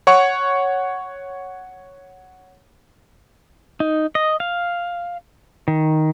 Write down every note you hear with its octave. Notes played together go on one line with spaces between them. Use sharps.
C#5 F#5 C#6
D#4
D#5
F5
D#3